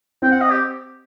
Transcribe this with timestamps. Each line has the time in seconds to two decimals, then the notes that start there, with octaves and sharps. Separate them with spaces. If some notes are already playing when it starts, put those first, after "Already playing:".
0.22 C4 C5 G5
0.31 F#5
0.41 D#5
0.51 G4